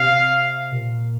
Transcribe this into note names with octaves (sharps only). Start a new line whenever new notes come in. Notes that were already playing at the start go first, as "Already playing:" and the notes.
Already playing: C3 F5
A#2